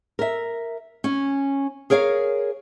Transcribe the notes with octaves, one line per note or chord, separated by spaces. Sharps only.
A#4 E5
C#4
G#4 A#4 C#5 F5